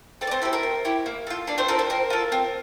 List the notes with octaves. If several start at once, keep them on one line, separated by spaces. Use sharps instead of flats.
C4 A4 A5
D5
C4 C5
E4 G4 A4
A#4
C4
E4 G4
A#3
F4 A4
A#3 D4 D5
C4 C5
F4 A4 A#4
C4 C5
C4 A#4
F4 A4
C4